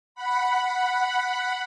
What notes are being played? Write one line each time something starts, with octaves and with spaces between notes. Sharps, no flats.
F#5 B5